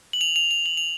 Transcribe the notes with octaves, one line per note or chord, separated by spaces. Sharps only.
F#7
F7
F7
F7
F#7
F7